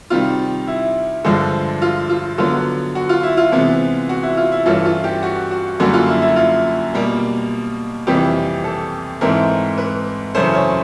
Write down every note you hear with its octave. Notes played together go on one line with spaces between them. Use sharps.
C3 D#3 G3 F4
E4
G2 D3 F3 G#3
F4
F4
D3 F#3 B3 F4
F#4
F4
E4
F4
C3 E3 G#3 B3
F#4
E4
F4
E4
G2 E3 A3 C#4 F4
F4
G4
F#4
F#4
F#2 D3 G3 A#3 F#4
F4
E4
E4
F4
B2 G3 A#3
F2 C3 E3 G3 G4
A4
G#2 E3 A3 C4 A#4
B4
F#2 C#3 E3 A3 C#4 C5
C#5